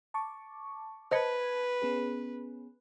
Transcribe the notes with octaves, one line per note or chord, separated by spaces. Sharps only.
A5 C#6 D6
B4 C5 D#5 A5 G#6 C#7
B3 C#4 G#4